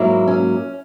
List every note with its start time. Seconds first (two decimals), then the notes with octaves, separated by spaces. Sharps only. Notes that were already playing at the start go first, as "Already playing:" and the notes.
Already playing: G#2 F#3 A#3 E4
0.27 C#4